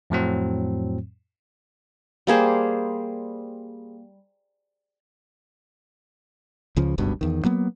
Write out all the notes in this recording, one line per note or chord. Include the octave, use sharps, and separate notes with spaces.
F2 A2 F#3 C4
G3 A#3 G#4 C5
C#2 C#3 F3
F#1 C#2 G2 B2
E2 D#3
F#3 A#3 B3